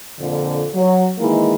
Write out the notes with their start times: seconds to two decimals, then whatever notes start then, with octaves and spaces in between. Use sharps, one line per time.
0.19 F2 A#2 D3
0.74 F#3
1.19 D#3 E3 G#3 A#3 E4